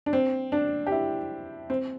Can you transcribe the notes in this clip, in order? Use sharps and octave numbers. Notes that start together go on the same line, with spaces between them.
D4
C4
D4
G4
E4
C4